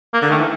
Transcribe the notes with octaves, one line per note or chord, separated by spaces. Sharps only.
A#3
D3
D#3 A3
E3